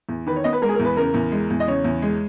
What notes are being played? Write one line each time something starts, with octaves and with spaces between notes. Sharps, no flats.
E2
D#3 B4
C#5
B3 D#5
B4
G#3 A#4
G#4
A#4
E2
B4
C#3 A#4
E2
G#3
E2
D#5
C#3 C#5
E2
G#3